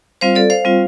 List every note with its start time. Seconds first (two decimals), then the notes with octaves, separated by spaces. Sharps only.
0.21 G3 C4 F4 C5 F5
0.35 A4 D5
0.50 C5 F5
0.65 G3 C4 F4